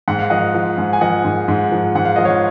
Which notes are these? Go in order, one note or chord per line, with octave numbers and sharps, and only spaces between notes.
G#2 F#5
F5
F3 D#5 F#5
F3
G#2
G#5
F3 D#5 F#5
G#2
G#2
F3
G#2 F#5
F5
F3 D#5
C#5 F5